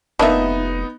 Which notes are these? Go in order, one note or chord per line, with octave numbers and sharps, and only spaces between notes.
F1 A#3 B3 D4 D#4 B4 D#5 E5